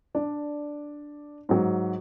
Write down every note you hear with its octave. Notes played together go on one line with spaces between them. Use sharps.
D4 D5
G#2 F#3